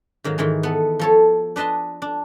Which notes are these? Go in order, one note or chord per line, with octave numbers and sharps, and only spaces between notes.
G#2 D#3 F#3 F5
G#2 D#3 E3 G#3
B3 A4
F3 A4 C#5
D4 B4 D#5 A5 C6
D4